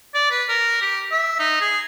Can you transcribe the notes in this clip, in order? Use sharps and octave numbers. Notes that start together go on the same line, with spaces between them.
D5
B4
A#4
G4
E5
D#4
G#4